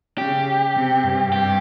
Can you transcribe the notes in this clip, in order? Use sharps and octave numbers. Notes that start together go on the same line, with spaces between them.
C#3 G4
C3
G2
G4